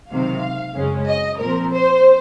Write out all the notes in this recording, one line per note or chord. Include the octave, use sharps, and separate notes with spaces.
C#2 C3 D#3 F#3 C4 F5
F#2 C#3 G#3 C#4
D#5
A#2 F3 C4 A#4
C5